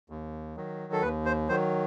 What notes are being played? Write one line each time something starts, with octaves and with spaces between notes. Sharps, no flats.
D#2
D#3 F#3
A4
D#2 B4
C5
D#3 F#3 C5